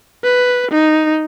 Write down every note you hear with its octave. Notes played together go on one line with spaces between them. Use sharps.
B4
D#4